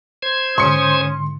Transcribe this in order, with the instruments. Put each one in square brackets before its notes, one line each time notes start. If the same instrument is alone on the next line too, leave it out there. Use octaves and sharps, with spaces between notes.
[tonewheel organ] C5 G#6
[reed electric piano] G#2 D3 [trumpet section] C#4 D#6 [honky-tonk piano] C6 C#7